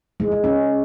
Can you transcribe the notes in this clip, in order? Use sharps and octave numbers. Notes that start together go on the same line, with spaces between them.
G#3
G#3
C#4